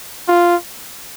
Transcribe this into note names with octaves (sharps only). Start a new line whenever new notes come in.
F4